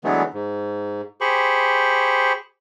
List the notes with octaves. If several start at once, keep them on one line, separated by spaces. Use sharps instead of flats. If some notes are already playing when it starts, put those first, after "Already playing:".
D3 E3 F#3 G#3 A3 B3
G#2
G4 G#4 C5 B5 C#6